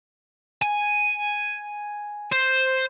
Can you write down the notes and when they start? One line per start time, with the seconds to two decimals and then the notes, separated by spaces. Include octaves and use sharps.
0.62 G#5
2.32 C5